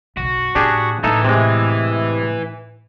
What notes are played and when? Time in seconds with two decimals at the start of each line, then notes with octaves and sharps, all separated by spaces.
0.17 B1 F#2 F#4
0.55 A2 D4 G4 G#4
1.04 A2 E3 D#4 A4
1.25 C3 G#3